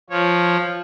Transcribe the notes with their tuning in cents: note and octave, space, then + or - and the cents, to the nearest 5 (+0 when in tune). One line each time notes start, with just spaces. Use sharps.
F3 +0 C#5 -10